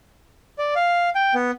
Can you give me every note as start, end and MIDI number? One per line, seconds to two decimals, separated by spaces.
0.58 0.74 74
0.75 1.10 77
1.15 1.34 79
1.34 1.51 59